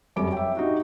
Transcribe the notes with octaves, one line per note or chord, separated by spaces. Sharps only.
F1 F#2 G3 C#5 D6 D7
E5 G5
D#4 F#4 G4